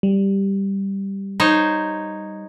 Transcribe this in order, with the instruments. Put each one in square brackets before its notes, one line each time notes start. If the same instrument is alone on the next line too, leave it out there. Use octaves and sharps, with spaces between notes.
[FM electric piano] G3
[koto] D#4 C5 C#5